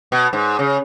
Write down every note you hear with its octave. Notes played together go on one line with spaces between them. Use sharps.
B2
G#2
C#3